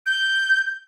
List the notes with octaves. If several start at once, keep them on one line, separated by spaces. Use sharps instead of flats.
G6